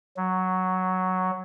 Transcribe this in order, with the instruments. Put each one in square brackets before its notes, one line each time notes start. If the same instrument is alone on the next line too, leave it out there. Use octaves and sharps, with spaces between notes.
[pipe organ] F#3